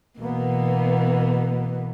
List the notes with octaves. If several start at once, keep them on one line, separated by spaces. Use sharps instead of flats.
B2 E3 A#3 B3